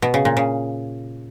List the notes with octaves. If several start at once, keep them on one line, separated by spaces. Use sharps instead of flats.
B2
C#3
A#2
C#3